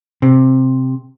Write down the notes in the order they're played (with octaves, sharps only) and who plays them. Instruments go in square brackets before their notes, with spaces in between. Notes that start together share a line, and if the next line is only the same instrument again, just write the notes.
[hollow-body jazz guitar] C3